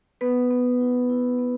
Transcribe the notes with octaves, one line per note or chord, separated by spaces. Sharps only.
B3 B4
B3
E4
E4
B3